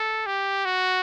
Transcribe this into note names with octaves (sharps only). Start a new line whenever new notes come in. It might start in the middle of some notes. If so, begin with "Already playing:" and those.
Already playing: A4
G4
F#4